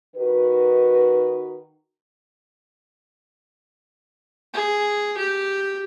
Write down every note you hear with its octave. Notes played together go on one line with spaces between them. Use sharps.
D#3 D#4 F#4 B4
G#4
G4